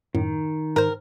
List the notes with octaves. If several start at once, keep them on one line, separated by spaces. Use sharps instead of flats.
F#2 A2 D#3
G#2 A#4 C5